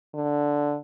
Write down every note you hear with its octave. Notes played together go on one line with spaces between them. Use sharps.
D3